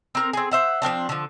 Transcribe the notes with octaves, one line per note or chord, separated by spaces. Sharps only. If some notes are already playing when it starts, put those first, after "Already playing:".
C4 A#4
C4 G#4
C5 E5 F#5
F3 A#3 C4 D4
D3 F3